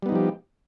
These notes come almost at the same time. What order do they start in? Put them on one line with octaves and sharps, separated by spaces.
G3 B3 D#4 F3 G4